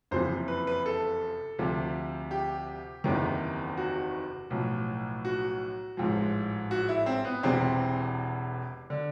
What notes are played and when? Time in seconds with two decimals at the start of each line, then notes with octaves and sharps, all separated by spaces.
0.11 F#1 F2 C3 E3 C5
0.48 B4
0.67 B4
0.86 A4
1.58 D2 C3 F3
2.31 G4
3.04 F#1 E2 C3 D#3
3.77 F#4
4.50 B1 A2 F3
5.25 F#4
5.97 A1 G#2 F3
6.71 F#4
6.89 E4
7.06 C4
7.25 B3
7.43 E1 E2 C3 E3 C4
8.90 D3